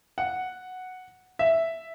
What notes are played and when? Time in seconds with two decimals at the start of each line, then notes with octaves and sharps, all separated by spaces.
0.18 F#5
1.39 E5